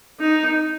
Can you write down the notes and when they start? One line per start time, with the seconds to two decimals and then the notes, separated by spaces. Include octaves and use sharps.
0.20 D#4